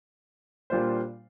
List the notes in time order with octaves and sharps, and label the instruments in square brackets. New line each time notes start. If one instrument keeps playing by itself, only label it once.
[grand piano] A#2 G3 D4 F4 C5